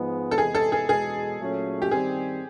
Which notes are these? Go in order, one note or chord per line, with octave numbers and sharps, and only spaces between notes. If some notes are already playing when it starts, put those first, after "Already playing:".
Already playing: G#2 F3 G#3 B3
A4
E2 C3 E3 G#3 B3 G#4
A4
G#4
E2 B2 G#3 G#4
A#2 F#3 A3 C#4
G4
D#3 G3 C4 G#4